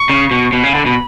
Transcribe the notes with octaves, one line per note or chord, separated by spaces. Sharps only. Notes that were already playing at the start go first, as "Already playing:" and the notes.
Already playing: C#6
C#3
B2
B2 B5
C#3
D3
B2